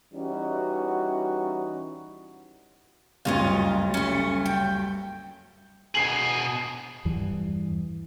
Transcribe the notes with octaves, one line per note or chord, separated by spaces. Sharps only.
E3 G3 C#4 D#4 E4 F#4
F#1 D2 G2 C#4 D#4 F4
A3 C#4
G5
B2 G#4 C7 F#7
E2 G2 E3